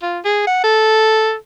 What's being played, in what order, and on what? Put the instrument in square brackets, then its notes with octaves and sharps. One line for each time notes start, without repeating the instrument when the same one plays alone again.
[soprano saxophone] F4
G#4
F#5
A4